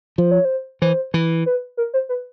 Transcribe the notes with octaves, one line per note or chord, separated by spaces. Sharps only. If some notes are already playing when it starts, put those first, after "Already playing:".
F3 C5
C#5
C5
E3 C5
E3
B4
A#4
C5
B4